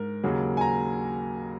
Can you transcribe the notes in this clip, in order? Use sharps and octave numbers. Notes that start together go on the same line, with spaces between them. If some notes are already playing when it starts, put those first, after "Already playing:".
Already playing: G#2 A#4
D#2 C#3 F#3 A#3
G#5
A#5